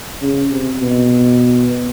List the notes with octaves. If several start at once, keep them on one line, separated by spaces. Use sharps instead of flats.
C#3
C3
B2